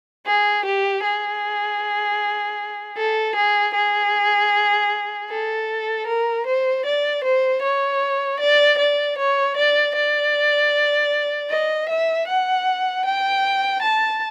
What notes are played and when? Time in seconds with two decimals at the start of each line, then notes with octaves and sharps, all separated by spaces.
0.27 G#4
0.65 G4
1.03 G#4
2.97 A4
3.36 G#4
3.75 G#4
5.30 A4
6.07 A#4
6.47 C5
6.86 D5
7.24 C5
7.63 C#5
8.40 D5
8.78 D5
9.18 C#5
9.57 D5
9.96 D5
11.50 D#5
11.89 E5
12.28 F#5
13.06 G5
13.82 A5